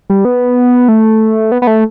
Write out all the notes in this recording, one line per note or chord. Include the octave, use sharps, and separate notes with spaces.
G3
B3
A3
B3
B3
A3